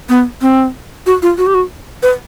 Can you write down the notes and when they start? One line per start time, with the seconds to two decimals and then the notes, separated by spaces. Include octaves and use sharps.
0.09 B3
0.42 C4
1.06 F#4
1.22 F4
1.38 F#4
1.47 G4
1.55 F#4
2.03 B4